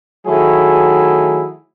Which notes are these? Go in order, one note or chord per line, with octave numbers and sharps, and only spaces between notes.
D#3 F#3 A3 E4 G#4